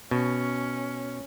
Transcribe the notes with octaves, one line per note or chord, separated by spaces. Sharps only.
B2 C#4